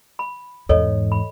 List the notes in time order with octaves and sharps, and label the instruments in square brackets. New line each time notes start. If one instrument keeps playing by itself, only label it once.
[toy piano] B5
[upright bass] E2 G#2 [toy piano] A4 C#5 D#5
[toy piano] B5